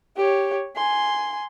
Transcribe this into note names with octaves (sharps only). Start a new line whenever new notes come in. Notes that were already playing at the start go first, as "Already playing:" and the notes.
G4 C#5
G#5 C6